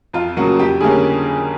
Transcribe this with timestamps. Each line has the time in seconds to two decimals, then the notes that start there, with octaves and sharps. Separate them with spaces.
0.13 F2 F4
0.37 C#3 F#3 A#3 F#4
0.59 F2 G4
0.81 D3 G3 A#3 C#4 G#4